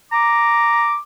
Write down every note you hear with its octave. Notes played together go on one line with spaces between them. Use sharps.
A#5 D6